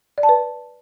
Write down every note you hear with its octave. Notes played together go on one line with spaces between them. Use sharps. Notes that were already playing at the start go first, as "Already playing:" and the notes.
D5
A5
B4